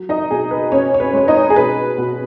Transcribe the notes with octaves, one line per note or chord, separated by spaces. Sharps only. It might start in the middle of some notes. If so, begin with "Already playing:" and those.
Already playing: F#3
D#4 D#5
B2 G#4
B4
B2 C#4 C#5
C#5
B4
G#3 C#5
D#4 D#5
G#4
B2 B4
B2